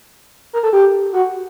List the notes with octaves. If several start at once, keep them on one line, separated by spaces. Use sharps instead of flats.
A#4
A4
G4
F#4